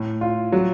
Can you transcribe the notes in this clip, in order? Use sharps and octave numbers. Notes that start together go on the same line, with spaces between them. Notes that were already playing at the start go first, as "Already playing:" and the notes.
Already playing: A2
F4
F#3